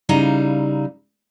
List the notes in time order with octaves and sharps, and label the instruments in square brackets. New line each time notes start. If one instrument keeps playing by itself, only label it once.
[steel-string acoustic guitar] C#3 G3 D#4 E4 F5 A#5